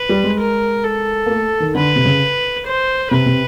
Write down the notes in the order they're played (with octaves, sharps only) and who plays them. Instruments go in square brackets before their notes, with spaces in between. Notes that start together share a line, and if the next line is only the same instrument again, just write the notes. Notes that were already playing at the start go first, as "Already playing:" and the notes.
Already playing: [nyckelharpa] B4
[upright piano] G3
G#3
[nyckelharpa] A#4
A4
[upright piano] A#3
A3
D#3
[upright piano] D3 [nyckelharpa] B4
[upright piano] C3
C#3
[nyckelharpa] C5
[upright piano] C3 [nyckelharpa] B4
[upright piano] C3